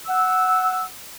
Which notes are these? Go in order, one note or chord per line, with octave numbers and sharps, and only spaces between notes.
F#5 E6